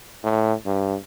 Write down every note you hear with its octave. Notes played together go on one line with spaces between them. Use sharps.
A2
G2